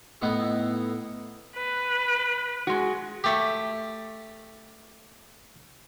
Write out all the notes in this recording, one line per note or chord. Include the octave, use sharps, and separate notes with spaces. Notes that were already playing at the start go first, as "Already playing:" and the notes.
A2 B3 D#4 E4 C#6
B4
G#3 F#4
A3 G4